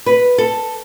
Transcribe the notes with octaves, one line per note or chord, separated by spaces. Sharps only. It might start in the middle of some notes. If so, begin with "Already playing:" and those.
B4
A4